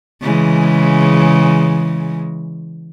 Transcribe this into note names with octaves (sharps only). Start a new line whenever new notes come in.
C#3 E3 G#3